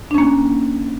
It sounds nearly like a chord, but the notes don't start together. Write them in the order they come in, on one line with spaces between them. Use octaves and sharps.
D4 C#4 A#3